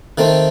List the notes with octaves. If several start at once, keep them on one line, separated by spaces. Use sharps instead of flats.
D#3 A3 C4